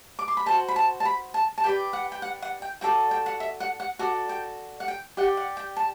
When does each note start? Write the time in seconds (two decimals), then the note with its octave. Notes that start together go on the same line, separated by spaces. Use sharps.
0.19 D6
0.28 C6
0.37 B5
0.46 F#4 A4 C5 A5
0.68 B5
0.76 A5
1.00 A5
1.05 B5
1.34 A5
1.58 A5
1.64 G4 B4 D5 G5
1.93 F#5
2.12 G5
2.22 F#5
2.42 F#5
2.62 G5
2.81 F#4 A4 D5 G5
3.11 G5
3.26 F#5
3.40 E5
3.60 F#5
3.80 F#5
3.99 F#4 A4 D5 F#5
4.29 G5
4.80 F#5
4.88 G5
5.17 G4 D5 F#5
5.37 F#5
5.57 G5
5.77 A5